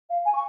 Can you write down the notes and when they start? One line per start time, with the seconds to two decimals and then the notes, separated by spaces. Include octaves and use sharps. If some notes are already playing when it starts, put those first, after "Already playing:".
0.09 F5
0.25 G#5
0.33 C#6